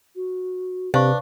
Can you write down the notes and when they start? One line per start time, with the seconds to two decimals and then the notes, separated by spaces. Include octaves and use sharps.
0.16 F#4
0.94 C3 D4 B4 C5 F5 C#6